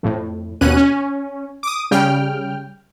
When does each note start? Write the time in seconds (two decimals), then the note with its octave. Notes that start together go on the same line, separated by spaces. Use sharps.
0.03 F2 A2
0.61 D#2 B2 C#4 F#6 D#7
0.77 C#4
1.63 D6 D#6
1.91 C#3 G3 G5 F6